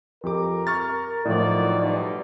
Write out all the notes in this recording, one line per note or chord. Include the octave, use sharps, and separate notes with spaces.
F2 G4 A#4 D6
C#6 F6 A6
A2 D#3 F3 F#3 D5
B2 G3 D#4